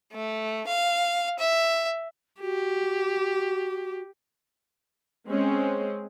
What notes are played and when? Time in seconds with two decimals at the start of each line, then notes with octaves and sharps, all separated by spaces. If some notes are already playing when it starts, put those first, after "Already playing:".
0.13 A3
0.67 F5
1.39 E5
2.41 F#4 G4
5.27 G#3 C4 C#4